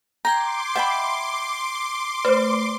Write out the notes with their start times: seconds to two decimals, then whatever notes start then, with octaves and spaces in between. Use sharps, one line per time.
0.25 G5 A#5 C6 D6 G6 G#6
0.75 D#5 E5 F#5 G5 B5
2.25 A3 B4 C5